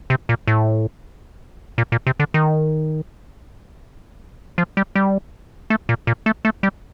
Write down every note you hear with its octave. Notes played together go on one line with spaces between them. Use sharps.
C3
A#2
A2
A#2
A#2
C3
D3
D#3
F3
G3
G3
A3
A#2
A#2
A3
A3
G3